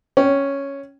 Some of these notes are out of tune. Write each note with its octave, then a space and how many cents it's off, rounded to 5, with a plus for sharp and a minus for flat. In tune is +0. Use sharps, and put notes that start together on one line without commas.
C#4 +0 G5 -5